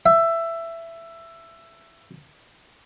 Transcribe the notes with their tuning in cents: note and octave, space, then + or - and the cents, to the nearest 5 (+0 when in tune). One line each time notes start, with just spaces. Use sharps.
E5 +15